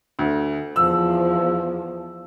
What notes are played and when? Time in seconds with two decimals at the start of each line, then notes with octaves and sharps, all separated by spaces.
0.19 D2
0.76 E2 F3 E6